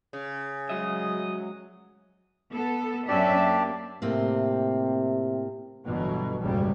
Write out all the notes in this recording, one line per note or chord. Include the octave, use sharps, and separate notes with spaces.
C#3
F#3 G#3 F#4 D#5 E5
B3 A4
F#2 C#4 D4 G4 D5 E5
A#3
A2 C3 A#3 C4
G1 B2 E3 F#3
F#1 B1 G#2 C#3 F#3 G3